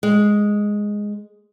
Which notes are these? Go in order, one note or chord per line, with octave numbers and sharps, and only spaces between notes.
G#3